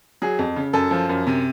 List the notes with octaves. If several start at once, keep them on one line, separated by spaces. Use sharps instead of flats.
F#3 G#4
F2
C#3
F#2 A4
F3
F#2
C3